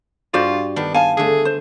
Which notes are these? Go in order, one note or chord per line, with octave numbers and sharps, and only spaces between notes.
G2 F4 F#4 C5 D5
D#3 B3 D4
F5 G#5 A5
D3 A3 G#4
C5